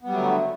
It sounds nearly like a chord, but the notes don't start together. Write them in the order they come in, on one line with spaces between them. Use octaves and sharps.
B3 G3 F#3 A3 D3